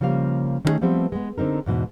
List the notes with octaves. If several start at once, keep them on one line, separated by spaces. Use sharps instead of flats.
C#3 F3 G3 A#3 F5
D#3 A3 B3 C#4 D#4 G#4
F3 G3 A3 B3 C4
G#3 B3
D3 C4 D#4 A#4
E2 G#2 B2